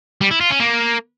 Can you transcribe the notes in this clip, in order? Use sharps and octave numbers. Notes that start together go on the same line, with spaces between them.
G3
E4
F4
C#4
A#3